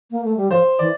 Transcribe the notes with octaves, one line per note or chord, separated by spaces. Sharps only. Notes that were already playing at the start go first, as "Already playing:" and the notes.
A#3
A3
G3
F3 C5
E3 D5